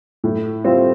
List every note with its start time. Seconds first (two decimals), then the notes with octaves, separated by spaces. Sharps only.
0.24 A2
0.64 G3 C4 F4